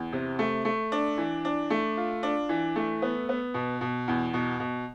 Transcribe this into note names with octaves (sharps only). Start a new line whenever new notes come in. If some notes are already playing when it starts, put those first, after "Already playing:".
Already playing: E2
C3
A3
A3
D4
E3
D4
A3
F4
D4
E3
A3
B3
B3
B2
B2
E2
B2
B2